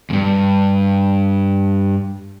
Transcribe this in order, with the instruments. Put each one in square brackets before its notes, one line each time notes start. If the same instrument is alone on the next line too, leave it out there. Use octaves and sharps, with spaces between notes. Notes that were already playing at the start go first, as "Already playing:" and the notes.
[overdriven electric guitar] E2 G2